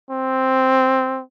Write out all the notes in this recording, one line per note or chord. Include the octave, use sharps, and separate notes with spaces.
C4